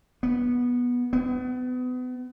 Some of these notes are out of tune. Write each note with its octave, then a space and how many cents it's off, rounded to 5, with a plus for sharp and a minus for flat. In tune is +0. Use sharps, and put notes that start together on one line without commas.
B3 -15
B3 +30